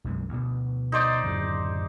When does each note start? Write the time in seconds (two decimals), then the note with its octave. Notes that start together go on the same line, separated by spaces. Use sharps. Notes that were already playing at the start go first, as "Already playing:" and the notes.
0.04 B1 F#2 G#3
0.29 D2 B2
0.92 D#4 C5 D5
1.24 D1 F#2 C#3